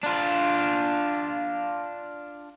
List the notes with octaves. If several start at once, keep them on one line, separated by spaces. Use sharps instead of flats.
D4 F4